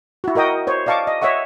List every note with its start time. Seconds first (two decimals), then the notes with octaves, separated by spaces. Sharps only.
0.24 E4 F#4
0.35 F#4 A#4 D#5 G5 D#6
0.67 C5 C#5
0.86 D5 D#5 F5 A5 C#6 D6
1.07 D#5
1.21 C#5 D#5 E5 F#5 C#6